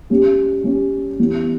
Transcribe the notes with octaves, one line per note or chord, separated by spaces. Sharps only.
G3 C#4 G4
G3 C#4 G4
E3 G3 B3